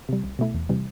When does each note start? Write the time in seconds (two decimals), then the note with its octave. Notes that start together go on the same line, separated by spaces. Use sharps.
0.09 C3 G3
0.24 C2
0.39 B2 A3 E4
0.54 E2
0.69 C3 E3 G3